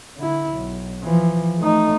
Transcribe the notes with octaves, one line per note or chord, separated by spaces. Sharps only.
D3 E4
B1
E3 F3
A3 D#4